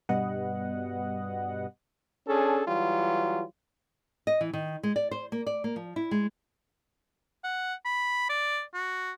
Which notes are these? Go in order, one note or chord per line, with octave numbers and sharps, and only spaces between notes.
G2 B2 G3 B3 D#5 F#5
C#4 D4 G#4 A4
E3 F#3 G3 F4
D#5
E3
D#3
G#3
D5
C5
A#3
D5
A#3
F3
E4
G#3
F#5
B5
D5
F#4